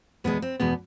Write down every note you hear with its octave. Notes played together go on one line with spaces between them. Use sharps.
E2 B2 G#3 B3
C4
E2 B2 G#3 B3